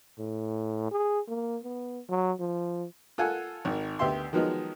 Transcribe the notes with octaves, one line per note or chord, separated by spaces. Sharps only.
A2
G#4
A#3
B3
F#3
F3
F4 A4 F#5 G#5
G#1 D#3
D2 B3 G4 E5 C6
D#3 F3 F#3 G#3 B3 D#4